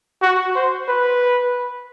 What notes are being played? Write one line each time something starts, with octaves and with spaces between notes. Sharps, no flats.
F#4
C5
B4